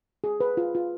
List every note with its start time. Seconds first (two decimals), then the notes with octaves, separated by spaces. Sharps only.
0.24 G#4
0.40 B4
0.57 F4
0.75 F4